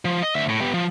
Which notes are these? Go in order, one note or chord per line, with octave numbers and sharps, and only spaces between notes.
F3
D#5
D2 E5
A2
B3 G4
F3